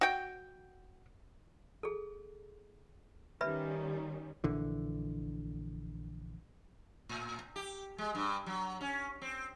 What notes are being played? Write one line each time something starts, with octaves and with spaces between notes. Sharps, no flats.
F#4 G5
G#4 A4
D#3 G3 C#4 B4 E5 B5
A#1 D3 E3
A2
G4
G#3
G2
F#3
C#4
C4